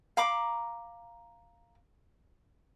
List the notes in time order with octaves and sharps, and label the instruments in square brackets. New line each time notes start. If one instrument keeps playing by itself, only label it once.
[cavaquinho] F5 A#5 B5 D6